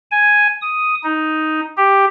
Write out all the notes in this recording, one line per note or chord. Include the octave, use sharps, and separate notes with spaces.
G#5
D#6
D#4
G4